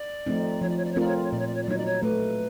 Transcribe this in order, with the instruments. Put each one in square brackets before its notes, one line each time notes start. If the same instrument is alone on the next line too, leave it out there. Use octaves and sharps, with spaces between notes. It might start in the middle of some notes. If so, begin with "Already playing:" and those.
Already playing: [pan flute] D5
[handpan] F3 A3 C4 D#4
[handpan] F3 [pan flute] C#5
[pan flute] D5
C#5
D5
C#5
[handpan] A3 C4 F4 A#4 [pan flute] D5
[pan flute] C#5
D5
C#5
[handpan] A#2 [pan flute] D5
[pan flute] C#5
D5
C#5
D5
[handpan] F#3 A#3 D#4 [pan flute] C#5
[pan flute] D5
C#5
[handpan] A3 [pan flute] B4